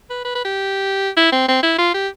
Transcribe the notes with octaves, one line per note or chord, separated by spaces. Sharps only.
B4
B4
B4
G4
E4
C4
C4
E4
F4
G4